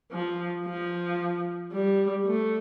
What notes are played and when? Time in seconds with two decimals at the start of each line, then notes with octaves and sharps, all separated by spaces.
0.12 F3
0.66 F3
1.72 G3
2.26 A3